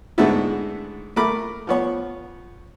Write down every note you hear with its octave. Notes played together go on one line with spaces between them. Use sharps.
G#2 D3 G#3 A3 B3 E4
A3 A#4 B5 D6
F3 B3 C#5